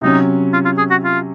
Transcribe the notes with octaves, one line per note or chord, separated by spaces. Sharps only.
C3 F#3 C#4 D#4
F4
F4
G#4
F#4
F4